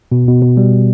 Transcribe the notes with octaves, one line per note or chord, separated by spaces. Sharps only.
B2
B2
B2
G3